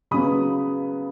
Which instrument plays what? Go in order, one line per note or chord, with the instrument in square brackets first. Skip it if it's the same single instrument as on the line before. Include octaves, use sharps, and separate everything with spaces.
[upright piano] C#3 F#3 B3 B5 D#6